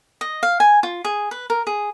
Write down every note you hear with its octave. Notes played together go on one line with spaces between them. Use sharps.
D#5
F5
G#5
F4
G#4
B4
A#4
G#4